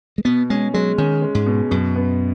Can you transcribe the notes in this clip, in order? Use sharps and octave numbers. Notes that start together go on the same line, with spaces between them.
G#3
B2 B3
G#3 C#4
F#3 G#3
D#3 C#4
G#3
G#2
B2
F#2 B2
B3